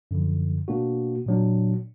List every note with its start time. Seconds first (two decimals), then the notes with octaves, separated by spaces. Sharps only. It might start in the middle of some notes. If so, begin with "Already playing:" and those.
0.11 F#2 D3 F3
0.68 B2 A#3 D4 F#4
1.26 A#2 F#3 D4